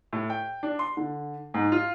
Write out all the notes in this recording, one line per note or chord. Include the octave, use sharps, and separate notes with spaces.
A2
G5
D4
C6
D3
G#2
F4